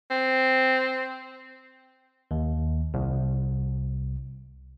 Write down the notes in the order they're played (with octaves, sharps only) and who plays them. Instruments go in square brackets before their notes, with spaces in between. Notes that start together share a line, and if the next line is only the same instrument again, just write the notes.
[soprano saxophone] C4
[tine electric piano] D#2
C2